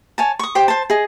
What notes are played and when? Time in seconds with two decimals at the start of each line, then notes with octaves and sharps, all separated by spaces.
0.18 C#5 G#5 A5
0.39 C#6 D#6
0.55 G4 C5 G5
0.68 C5 A5
0.90 G#4 D#5